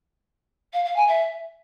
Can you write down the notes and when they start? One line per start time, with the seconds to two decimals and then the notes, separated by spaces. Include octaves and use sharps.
0.73 F5
0.84 F5
0.96 G#5
1.08 E5